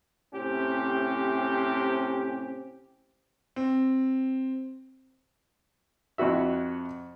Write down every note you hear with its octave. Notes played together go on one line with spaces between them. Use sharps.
A2 C3 C#4 G4
C4
F2 E4 F#4 E5